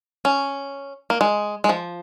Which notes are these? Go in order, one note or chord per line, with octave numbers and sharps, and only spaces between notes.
C#4
A#3
G#3
G#3
F3